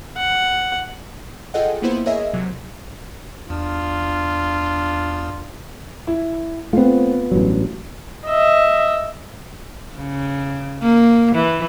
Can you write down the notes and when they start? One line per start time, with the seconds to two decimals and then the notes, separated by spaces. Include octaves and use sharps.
0.17 F#5
1.54 F4 G#4 A4 D#5 F#5 G5
1.82 A#3 B3 E4 C5
2.06 G#4 A#4 C#5 D#5 E5
2.33 C3 F#3
3.50 E2 D4 F4
6.07 E4
6.73 A3 B3 C4 F4
7.32 A1 G2 F#3
8.27 D#5 E5
9.96 C#3
10.82 A#3
11.35 E3